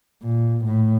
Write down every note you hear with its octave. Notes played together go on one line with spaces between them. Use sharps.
A#2
A2